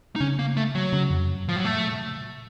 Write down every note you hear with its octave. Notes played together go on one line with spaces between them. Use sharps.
D#4
C#3 C#4
A#3
A3
F#3
C#3
F2
F#2
A2 F3
F#3
A#2 A3
C3
C#3
A#2